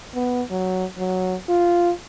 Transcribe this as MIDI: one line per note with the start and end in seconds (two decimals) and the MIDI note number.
0.15 0.42 59
0.51 0.85 54
0.98 1.35 54
1.49 1.91 65